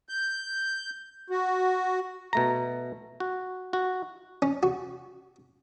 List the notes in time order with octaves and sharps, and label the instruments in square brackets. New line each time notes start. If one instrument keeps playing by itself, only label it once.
[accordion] G6
F#4
[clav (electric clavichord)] B2 A3 A#5
F#4
F#4
[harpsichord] C#4
F#4